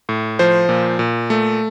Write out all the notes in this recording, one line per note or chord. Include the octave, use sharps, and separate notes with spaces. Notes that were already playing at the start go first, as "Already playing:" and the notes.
A2
F3 C5
A#2
A#2
A3